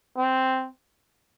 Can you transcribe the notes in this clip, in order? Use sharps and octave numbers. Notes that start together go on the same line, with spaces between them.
C4